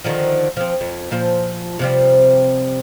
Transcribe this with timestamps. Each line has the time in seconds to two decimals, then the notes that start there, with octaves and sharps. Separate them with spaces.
0.04 D3 D#3 F3
0.57 F3 C4
0.81 F2
1.11 A#2 F3 C5
1.79 C3 F3 G3